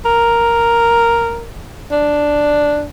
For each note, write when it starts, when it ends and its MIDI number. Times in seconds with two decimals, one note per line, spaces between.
0.05 1.44 70
1.91 2.86 62